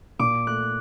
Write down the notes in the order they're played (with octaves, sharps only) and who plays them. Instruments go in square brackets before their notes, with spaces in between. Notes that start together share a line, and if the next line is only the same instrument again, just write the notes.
[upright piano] A#2 [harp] D6
[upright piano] A3 [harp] F#6